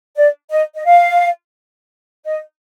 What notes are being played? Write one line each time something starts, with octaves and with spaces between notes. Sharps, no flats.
D5
D#5
D#5
F5
D#5